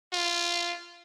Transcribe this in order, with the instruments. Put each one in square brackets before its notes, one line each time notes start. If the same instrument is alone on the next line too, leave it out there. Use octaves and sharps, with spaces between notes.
[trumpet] F4